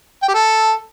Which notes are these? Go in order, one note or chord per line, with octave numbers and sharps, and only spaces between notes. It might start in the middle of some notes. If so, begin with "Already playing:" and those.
G5
G4
A4